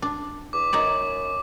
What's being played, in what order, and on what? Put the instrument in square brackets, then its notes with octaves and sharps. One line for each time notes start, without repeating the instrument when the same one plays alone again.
[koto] D4
[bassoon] E2 [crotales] D6
[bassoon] F#2 [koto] D#4 C#5 D5